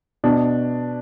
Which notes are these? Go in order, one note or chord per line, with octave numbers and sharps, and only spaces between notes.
B2 D4